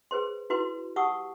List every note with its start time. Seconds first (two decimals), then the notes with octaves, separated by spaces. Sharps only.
0.11 G#4 B4 C5 C6
0.50 E4 F#4 B4 C6
0.96 G4 F#5 A5 C#6 D#6 E6